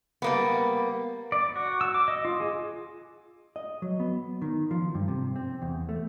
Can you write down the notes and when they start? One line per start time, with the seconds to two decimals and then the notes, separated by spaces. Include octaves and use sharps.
0.22 G3 A#3 B3
1.32 D5
1.56 F#4
1.81 E6
1.95 D6
2.08 D#5
2.25 F4
2.40 G#4
3.56 D#5
3.82 F#3
4.00 B3
4.42 D#3
4.71 F3
4.95 G2
5.08 C3
5.36 C4
5.62 E2
5.89 A3